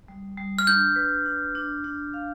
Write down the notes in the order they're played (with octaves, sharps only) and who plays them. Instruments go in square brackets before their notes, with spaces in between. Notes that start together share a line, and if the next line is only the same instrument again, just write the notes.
[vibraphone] G3
G3
[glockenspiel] F6
[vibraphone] D4 [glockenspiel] G6
[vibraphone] B4
D4
D4
D4
F5